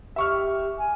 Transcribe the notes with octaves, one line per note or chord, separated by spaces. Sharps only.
G4 E5 C#6 F6
G#5